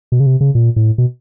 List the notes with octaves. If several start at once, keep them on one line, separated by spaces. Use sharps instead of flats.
B2
C#3
C3
C#3
A#2
A2
B2